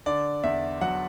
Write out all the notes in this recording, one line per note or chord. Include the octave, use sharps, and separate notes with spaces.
D3 D5
E2 E5
F#3 F#5